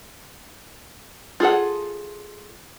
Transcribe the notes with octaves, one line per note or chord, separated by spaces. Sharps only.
F4 G#4 A4 F#5